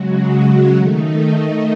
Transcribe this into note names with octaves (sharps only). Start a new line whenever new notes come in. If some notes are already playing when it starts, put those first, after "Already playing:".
Already playing: C#3 F#3 G#3 F#4
F#3 F#4
D#3 A3 D#4